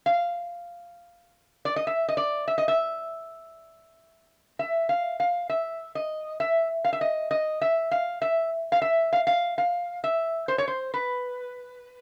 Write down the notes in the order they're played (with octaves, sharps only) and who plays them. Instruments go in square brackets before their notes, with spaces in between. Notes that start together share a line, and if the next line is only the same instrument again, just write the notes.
[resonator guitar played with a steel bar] F5
D5
D#5
E5
D#5
D5
E5
D#5
E5
E5
F5
F5
E5
D#5
E5
F5
E5
D#5
D#5
E5
F5
E5
F5
E5
F5
F5
F5
E5
C5
C#5
C5
B4